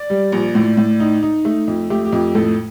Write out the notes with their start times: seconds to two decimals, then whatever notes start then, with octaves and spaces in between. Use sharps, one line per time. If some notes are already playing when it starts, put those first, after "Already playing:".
Already playing: D5
0.10 G3
0.32 A#1
0.55 A2
0.77 A2
1.00 D#4
1.23 D#4
1.45 A3
1.68 F2
1.90 A3 G4
2.05 G4
2.12 F2
2.35 A2 A4